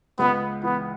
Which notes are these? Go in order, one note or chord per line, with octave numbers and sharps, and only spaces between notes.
C#2 B3
E3 B3